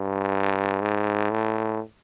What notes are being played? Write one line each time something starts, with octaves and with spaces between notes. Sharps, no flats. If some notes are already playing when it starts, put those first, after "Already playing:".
Already playing: G2
G#2
A2